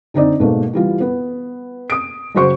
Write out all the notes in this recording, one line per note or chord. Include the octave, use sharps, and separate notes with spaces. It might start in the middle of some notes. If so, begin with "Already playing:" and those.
D3 C4 D#4 D5
G#2 B2 A3 A#3
E3 G3 F4
B3
D#6 D7
F#2 C#3 F#4 C5 C#6